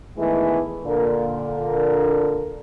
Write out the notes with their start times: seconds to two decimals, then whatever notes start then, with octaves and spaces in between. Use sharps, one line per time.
0.18 D#3 E3 G#3 A3 B3 G#4
0.85 A#2 D3 A#4